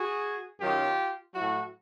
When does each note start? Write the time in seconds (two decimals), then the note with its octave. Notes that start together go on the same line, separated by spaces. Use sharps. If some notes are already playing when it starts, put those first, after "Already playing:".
Already playing: F#4 G#4
0.60 F#2 D#3 F#3 F4 G4
1.34 A2 F#3 E4 F#4